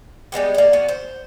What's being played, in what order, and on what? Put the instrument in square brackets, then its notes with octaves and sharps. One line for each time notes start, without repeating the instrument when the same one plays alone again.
[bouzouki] G3 G#3 B3 G4
A#3 D5
B3 F#4
C5